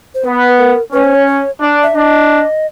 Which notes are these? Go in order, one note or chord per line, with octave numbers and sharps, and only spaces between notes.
C5
B3 B4
A#4
C#4 B4
C5
C#5
C#5
D4
E5
D4 D#5